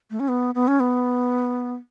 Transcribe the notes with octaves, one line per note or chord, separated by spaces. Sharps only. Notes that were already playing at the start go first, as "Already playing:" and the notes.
A3
C#4
B3
B3
C#4
B3